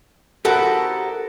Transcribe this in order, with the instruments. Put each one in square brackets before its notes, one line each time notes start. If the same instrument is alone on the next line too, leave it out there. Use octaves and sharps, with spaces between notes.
[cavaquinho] E4 F#4 A5 [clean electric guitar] G4 A#4 C5 [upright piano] A4